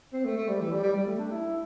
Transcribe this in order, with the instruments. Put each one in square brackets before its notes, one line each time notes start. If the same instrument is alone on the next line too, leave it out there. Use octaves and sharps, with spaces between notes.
[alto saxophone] C4
A3
A3
G3
E3
G3
G3
G3
A3
D4
E4